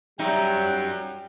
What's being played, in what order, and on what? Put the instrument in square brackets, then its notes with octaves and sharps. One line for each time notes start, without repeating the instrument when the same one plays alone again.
[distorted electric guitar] F#3 C#4 [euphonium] G3 [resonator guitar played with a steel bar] D#4 E5 A#5 [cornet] G5